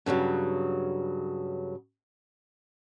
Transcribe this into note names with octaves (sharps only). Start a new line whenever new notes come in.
G2 C#3 E3 F#3